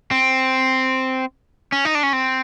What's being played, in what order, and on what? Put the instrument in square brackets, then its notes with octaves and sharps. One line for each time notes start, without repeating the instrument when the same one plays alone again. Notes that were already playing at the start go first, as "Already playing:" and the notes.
[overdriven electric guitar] C4
C#4
D#4
D4
C#4
C4